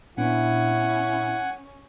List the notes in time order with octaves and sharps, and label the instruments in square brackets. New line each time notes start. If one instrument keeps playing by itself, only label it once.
[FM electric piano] A#2 B3 D4 [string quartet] C#4 [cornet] E4 [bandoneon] F#5 G#5